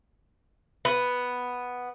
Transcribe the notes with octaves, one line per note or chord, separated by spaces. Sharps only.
B3